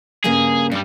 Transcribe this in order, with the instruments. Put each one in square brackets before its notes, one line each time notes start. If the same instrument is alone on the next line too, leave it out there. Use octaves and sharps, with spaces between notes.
[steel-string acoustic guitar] G2 C#3 A#3 [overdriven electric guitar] G#4
[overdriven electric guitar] G2 G3 [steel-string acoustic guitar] D4